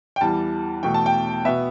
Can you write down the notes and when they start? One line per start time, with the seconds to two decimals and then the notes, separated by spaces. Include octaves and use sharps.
0.16 G5
0.21 E2 E3 G3 A5
0.83 E2 B2 A3 G5
0.94 A5
1.06 G5
1.45 B2 B3 E5